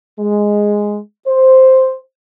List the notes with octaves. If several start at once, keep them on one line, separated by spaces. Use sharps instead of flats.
G#3
C5